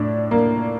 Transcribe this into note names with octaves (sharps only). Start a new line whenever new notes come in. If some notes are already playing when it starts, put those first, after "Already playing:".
Already playing: A2 D4
A#3